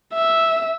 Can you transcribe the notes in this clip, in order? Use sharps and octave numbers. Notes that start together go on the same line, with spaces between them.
E5